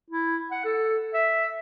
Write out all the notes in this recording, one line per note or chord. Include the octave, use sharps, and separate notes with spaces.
E4
F#5
A4
E5